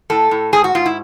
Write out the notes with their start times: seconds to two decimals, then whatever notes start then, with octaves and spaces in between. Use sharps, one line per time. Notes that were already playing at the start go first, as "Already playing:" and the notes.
0.10 A2 A4
0.31 A2
0.53 G#2 G#4
0.64 F#4
0.75 G#2 F4
0.86 E4